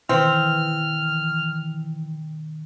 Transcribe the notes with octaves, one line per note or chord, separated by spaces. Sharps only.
B2 D#3 E3 C4 F6